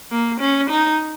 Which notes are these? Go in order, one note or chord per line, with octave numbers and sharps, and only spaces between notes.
A#3
C#4
D#4